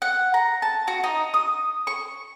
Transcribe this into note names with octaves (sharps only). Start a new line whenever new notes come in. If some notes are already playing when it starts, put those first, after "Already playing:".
F#5
A#5
A5
F#4
D#4
D#6
C#6